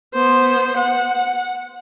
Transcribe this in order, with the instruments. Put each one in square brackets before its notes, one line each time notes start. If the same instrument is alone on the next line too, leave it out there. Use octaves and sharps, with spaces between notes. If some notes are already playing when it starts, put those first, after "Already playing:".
[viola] B3 C5
F#5